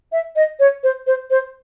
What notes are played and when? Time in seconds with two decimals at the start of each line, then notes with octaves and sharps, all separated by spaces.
0.12 E5
0.36 D#5
0.60 C#5
0.83 C5
1.07 C5
1.30 C5